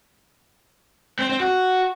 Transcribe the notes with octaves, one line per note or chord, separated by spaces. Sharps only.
C4
C4
F#4